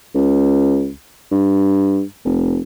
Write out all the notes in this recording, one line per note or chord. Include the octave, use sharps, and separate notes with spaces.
C#2
G2
F1